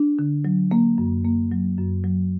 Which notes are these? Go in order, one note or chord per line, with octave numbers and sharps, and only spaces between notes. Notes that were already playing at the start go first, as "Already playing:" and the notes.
Already playing: D4
D3
F#3
A#3
F#2
A#3
F#3
F#2
F#3